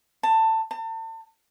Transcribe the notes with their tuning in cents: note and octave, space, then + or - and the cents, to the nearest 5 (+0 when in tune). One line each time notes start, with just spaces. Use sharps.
A5 +20
A5 +40